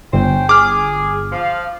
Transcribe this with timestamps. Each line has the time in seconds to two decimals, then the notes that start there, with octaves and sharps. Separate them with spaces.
0.13 G1 C#4 C5 G5
0.49 G#4 D6 F6
1.32 F3 F5